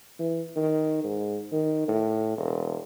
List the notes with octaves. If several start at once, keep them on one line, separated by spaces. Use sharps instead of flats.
E3
D#3
G#2
D#3
A2
E1